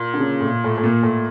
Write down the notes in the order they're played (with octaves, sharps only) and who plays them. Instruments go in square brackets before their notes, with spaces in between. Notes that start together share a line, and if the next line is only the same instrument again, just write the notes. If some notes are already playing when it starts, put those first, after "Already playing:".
Already playing: [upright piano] A#2
[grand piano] D3
C#3
A2
A#2
A2
A2
A#2
A2